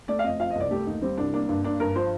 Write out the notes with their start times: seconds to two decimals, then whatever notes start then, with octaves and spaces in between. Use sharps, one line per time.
0.08 A3 D5
0.19 F5
0.24 F2 D#5
0.40 F3 F5
0.51 D#5
0.55 C2 D5
0.71 A3 G4
0.86 D#2 D#4
1.02 G3 C4
1.17 C2 D4
1.33 A#3 D4
1.49 G2 D4
1.64 A#3 D4
1.80 G2 A#4
1.95 F3 C5